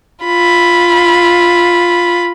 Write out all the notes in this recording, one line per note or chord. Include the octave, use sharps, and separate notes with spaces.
F4 B5